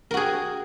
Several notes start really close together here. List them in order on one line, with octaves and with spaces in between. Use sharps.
A#4 F#4 G#4